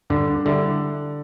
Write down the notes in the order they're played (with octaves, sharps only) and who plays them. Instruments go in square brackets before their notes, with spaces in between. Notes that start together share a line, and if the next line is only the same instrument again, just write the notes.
[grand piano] G2 [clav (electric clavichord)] D3
[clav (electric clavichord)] D3 [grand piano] G3 E4 G4